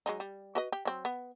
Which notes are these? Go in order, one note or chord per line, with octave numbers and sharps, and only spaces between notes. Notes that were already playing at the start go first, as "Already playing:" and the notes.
F#3 G#3 D#4
G3
F#4 B4 D#5
G4
F#3 C4
B3